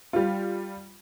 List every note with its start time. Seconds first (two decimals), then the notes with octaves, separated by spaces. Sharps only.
0.13 G3 F4